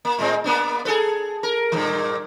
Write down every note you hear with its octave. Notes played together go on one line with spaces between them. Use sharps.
A#3
A2 G#3 C4
A#3 B3 D4
G#4 A4 B4
A#4
G2 A#2 E3